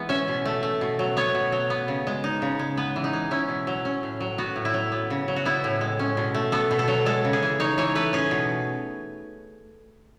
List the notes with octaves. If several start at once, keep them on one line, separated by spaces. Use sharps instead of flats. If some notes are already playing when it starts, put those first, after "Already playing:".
Already playing: E3 G#3 B3
C#4 E5
B2
A3
A3
B2
F#3
B3 C#5
B2
F#3
B3
C#3
G#3
D#4
C#3
G#3
B3 B4
E3
D#4
G#3
C#4 E4
B2
F#3
C#4
A2
F#3
B3 F#4
A2
E4
F#3
B3
C#3
F#3
F#4
B3 E4
A2
G#3
C#4
B2
A3
B3 A4
B2
A4
F#3
G#3 A4
C#3
G#4
E3
D#4 C#5
E3 C#5
A3 B4
C#4 G#4
B2